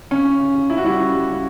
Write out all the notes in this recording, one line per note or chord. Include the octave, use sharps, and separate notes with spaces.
C#3 C#4
C#3
C#3
C#3
C#3 E4
F#4
G3 E4
C#3
G3
C#3